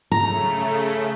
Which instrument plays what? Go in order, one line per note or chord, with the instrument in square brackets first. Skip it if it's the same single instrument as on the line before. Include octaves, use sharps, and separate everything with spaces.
[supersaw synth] C#3 A3 [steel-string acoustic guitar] A#5